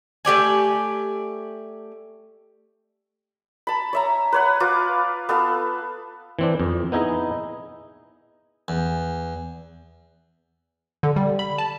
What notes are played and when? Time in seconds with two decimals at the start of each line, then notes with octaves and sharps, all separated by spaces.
0.25 A3 G4 D5 G#5
3.67 A5 B5
3.93 C#5 E5 A#5
4.32 B4 C#5 F#5
4.60 F4 B4 D6
5.29 B3 A4 F5
6.39 E3 C4 D4
6.60 F2
6.92 B3 D#4 E4 G#4 D#5
8.68 E2
11.03 D3
11.16 G3
11.39 B5
11.58 A5